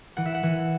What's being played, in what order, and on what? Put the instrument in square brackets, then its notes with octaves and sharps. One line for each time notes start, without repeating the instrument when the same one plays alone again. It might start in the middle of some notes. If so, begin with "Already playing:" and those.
[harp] E3 F#5
E5
F#5
E3